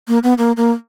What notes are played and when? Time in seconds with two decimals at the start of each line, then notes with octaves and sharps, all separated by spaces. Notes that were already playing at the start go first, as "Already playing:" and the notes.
0.08 A#3
0.23 B3
0.38 A#3
0.57 A#3